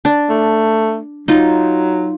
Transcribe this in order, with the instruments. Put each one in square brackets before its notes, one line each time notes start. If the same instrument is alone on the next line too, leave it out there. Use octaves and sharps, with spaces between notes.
[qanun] D4
[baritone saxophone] A3
[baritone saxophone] F#3 [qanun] D#4 F4